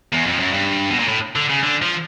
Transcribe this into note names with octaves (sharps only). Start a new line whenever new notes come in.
E2
F2
F#2
G2
B2
A#2
A2
D3
C#3
D3
F3